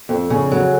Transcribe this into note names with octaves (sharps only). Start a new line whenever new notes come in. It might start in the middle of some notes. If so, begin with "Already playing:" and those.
F2 A4
C#3
F#3